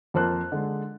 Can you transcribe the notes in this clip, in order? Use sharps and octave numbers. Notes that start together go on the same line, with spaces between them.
F2 A#3 A#4 C5 A5 F#6
D3 G#3